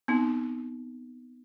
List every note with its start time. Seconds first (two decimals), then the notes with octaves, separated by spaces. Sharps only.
0.08 B3 C4 D#4